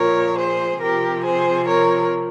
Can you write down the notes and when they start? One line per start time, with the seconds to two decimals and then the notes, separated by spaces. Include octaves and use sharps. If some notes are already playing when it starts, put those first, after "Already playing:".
Already playing: A#2 F3 A#4 C#5
0.37 G#4 C5
0.80 C3 F3 G4 A#4
1.23 G#4 C5
1.66 A#4 C#5